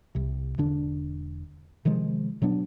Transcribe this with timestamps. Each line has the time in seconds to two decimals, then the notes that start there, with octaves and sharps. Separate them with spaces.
0.15 C2 C3
0.58 E1 D3 D4
1.85 C3 D#3 F3 G#3
2.42 B2 F#3 B3 D4